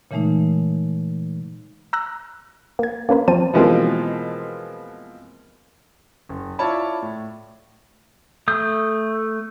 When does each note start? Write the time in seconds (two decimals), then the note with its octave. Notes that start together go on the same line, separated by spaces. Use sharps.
0.11 A#2 C#3 E3 G#3 A3 D#4
1.93 A#5 E6 F#6 A#6
2.79 A#3 G#6
3.09 A#3 C#4 A#4 B4
3.28 F3 C4 C5 A5 D#7
3.53 B2 E3 F3 G#3 A#3 C4
6.29 F#1
6.59 E4 F4 C#5 D5 A5 B5
7.02 A2
8.48 A3 D#6 G6